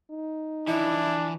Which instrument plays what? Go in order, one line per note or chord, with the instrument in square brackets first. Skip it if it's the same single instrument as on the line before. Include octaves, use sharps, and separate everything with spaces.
[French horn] D#4
[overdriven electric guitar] E3 F3 [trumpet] D4 [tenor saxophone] E4